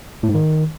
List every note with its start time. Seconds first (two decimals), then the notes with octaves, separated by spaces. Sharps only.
0.23 A2
0.29 G#2
0.35 D#3